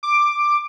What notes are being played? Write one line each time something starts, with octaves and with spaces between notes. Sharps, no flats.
D6